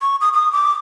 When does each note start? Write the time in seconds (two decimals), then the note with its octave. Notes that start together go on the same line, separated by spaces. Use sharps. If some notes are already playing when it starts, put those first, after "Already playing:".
0.01 C#6
0.21 D#6
0.33 D#6
0.52 D6